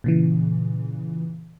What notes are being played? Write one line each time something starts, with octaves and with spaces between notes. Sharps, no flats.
A#2 C#3 E3